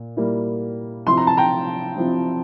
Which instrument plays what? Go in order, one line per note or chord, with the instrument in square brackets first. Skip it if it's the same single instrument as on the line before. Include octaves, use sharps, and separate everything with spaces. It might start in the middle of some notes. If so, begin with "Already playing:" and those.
Already playing: [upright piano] A#2
A#2 G3 A#3 E4
C3 F3 C4 E4 C6
A#5
A5
G5 A#5
C3 F3 C4 E4